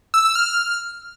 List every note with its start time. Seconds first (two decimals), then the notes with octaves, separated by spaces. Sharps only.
0.14 E6
0.25 E6
0.35 F6